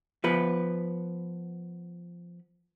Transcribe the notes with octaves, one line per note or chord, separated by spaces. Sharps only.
F3 B3 B4